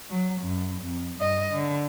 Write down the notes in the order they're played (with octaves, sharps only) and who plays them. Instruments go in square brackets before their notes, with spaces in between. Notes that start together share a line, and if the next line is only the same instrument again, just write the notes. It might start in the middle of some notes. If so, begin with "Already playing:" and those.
[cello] F#3
F#2
F2
G2 D#5
D3